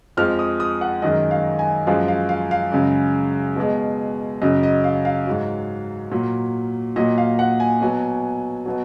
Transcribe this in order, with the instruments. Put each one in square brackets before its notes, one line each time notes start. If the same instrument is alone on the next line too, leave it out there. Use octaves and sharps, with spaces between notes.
[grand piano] F2 F3 G#3 F6
D#6
D#6
F#5
F#2 D#3 G#3 D#5
F5
G#5
F#2 F3 G#3 F5
F5
F5
F5
F#2 C#3 G#3
B2 G#3
F#2 C#3 F#3 D#5
D#5
F5
F5
G#2 F#3
A#2 F#3
A#2 F#3 D#5
F5
F#5
G#5
B2 F#3
B2 F#3